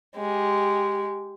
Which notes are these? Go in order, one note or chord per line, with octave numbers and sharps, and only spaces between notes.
G#3 G4